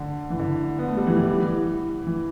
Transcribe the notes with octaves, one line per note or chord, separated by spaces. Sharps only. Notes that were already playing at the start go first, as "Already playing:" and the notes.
Already playing: D3
E3
D3
B3
A3
G3
E3
E3
G3
E3
E3